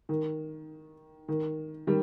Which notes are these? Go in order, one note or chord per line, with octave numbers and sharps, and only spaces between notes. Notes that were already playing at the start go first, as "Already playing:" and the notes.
D#3
D#3
D#3 G3